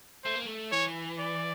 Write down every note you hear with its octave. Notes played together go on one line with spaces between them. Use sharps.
A3 C5
A#3
A3
E3 C#5
D5